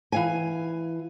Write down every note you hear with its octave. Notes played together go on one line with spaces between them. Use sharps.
E3 F5 G#5